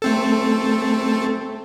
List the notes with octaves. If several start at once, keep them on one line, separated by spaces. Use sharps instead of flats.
A3 C4 A4